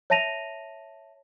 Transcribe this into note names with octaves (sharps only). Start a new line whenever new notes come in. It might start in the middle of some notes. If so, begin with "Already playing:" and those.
C#5 E5 A5 A#6 D#7 F7